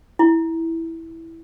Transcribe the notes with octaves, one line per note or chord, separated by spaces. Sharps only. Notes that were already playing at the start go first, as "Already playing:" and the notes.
E4